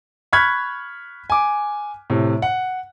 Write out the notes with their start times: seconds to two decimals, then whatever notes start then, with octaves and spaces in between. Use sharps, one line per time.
0.33 B5 C#6 F6 F#6 G#6 B6
1.30 G#5 D6
2.10 A2 C3
2.42 F#5